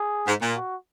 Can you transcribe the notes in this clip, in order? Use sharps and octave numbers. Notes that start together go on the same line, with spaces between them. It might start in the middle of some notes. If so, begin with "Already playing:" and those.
Already playing: G#4
G#2
A#2
F#4